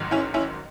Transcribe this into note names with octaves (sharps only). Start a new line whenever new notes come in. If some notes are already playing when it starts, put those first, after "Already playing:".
Already playing: A1 G#2 D#3 F#3
C#4 E4
C#4 E4